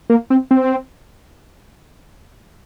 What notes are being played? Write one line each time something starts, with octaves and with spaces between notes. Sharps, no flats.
A#3
C4
C4